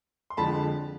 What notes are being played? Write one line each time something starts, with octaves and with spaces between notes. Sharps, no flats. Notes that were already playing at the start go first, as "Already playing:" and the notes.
C6
F2 D3 F3 G#3 A5 B5